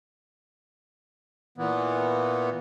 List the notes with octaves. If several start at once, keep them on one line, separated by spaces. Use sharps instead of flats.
A#2 E3 B3